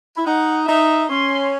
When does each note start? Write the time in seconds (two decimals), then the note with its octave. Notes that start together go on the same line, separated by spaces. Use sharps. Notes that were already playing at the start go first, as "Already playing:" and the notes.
0.16 E4
0.26 D#4 F#5
0.67 D#4 E5
1.08 C#4 C6